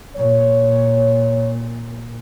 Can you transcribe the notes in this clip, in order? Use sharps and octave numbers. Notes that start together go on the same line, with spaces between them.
A#2 C#5